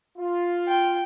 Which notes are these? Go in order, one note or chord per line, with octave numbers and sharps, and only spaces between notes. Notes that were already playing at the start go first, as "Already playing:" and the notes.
F4
G5